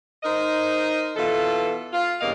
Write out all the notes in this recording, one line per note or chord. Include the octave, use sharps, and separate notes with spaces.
D#4 A#4 C5 D#5
B2 E3 F4 A4
F4
E2 G2 C#3 A#3 D#5 F5